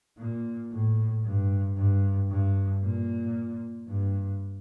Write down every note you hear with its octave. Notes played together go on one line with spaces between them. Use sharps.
A#2
A2
G2
G2
G2
A#2
G2